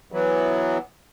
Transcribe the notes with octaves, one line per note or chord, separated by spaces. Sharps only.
E3 F#3 B3